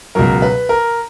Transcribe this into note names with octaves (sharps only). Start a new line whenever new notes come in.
C#2 B2 F#3 A#4
B4
A#4